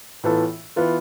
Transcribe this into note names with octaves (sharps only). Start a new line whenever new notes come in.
A2 E3 B3 F4 A4
E3 B3 F4